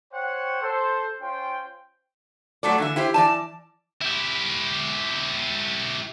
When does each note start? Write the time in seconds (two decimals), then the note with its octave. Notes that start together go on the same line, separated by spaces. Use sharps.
0.13 C5 C#5 F#5 G5
0.61 A4 C5
1.21 C#4 F4 C5 G5 C6
2.63 F#3 A3 A4 D5
2.78 D3 E3 E5
2.96 E4 G4 C5
3.14 E3 D5 A5
4.02 E4 G4